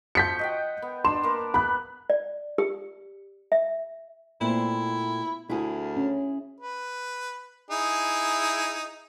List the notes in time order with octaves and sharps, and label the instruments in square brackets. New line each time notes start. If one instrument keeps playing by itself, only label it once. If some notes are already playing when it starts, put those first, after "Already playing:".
[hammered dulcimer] F3 F#4 [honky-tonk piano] G6 B6 C#7
[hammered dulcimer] D#5 F#5 G5
B3
[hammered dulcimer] D4 [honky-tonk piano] C6 E7
[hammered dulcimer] A#3 A#4 B4
[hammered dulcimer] B3 [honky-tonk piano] B5 F#6
[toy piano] D5
G4
E5
[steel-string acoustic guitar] A#2 A3 C4 [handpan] B3 [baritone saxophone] E4
[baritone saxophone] D2 [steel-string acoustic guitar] E4 G#4
[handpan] C#4
[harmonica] B4
D#4 E4 G#4